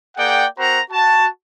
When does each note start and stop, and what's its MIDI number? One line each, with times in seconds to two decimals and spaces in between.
0.17 0.45 58
0.17 0.45 68
0.17 0.45 74
0.17 0.45 78
0.17 0.45 79
0.58 0.79 60
0.58 0.79 66
0.58 0.79 70
0.58 0.79 72
0.58 0.79 78
0.58 0.79 82
0.90 1.26 66
0.90 1.26 81